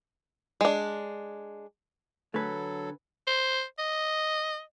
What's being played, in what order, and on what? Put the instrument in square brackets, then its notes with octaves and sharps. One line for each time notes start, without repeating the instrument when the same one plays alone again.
[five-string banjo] G#3 D4
[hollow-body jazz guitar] D3 G#4 B4 [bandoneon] F#3 A4 [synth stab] A3
[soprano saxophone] C5
D#5